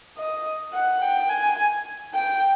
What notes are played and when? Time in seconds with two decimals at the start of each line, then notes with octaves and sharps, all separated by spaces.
0.17 D#5
0.73 F#5
1.01 G5
1.30 G#5
2.14 G5